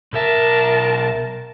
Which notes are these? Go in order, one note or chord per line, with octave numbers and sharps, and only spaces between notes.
B1 A#4 E5 A5